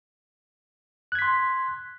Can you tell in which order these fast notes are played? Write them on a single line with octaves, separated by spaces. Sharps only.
F#6 G#6 B6 C6